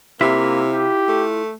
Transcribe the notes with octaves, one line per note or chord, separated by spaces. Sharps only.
C3 A#3 E4 F4 E5
G4
A3